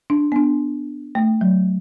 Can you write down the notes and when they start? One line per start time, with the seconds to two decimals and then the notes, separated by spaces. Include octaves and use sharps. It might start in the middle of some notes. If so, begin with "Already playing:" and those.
0.10 D4
0.32 B3
0.36 D4
1.15 A3
1.41 F#3